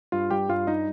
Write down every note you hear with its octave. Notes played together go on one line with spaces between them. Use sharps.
G2 F4 F5
G3 G4 G5
G2 F4 F5
G3 D#4 D#5